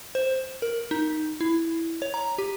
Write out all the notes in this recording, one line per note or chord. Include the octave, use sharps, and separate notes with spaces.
C5
A#4
D#4
E4
C#5
A#5
G4